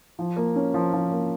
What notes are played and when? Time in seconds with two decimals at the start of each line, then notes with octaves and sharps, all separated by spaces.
0.19 F3
0.36 A#3
0.56 C#4
0.74 F3
0.93 F3
1.12 A#3